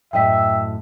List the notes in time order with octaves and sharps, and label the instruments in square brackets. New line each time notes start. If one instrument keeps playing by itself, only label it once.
[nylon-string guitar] F#2 A2 D#5 [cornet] E5 [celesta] G5 B6